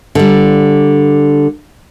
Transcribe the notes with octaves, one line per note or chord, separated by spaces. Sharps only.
D3 G3